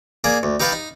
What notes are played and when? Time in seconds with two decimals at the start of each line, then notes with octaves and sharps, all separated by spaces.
0.24 A#3 G#4 D5 G#5
0.43 D2
0.60 D#4 G4 B4 F5 G5 A5
0.72 D#4